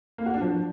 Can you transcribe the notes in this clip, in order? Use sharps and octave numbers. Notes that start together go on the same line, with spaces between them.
A#3
F#4
D4
F3